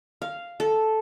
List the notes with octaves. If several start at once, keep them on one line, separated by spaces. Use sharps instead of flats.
F5
A4